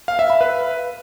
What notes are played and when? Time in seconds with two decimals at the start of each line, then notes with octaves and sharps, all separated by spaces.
0.08 F5
0.19 E5
0.30 B5
0.41 B4